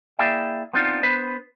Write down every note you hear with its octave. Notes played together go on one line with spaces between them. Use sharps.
A#3 E4 G#4 D5 E5 G5
B3 C4 D4 D#4 F4
B3 D4 B4 C5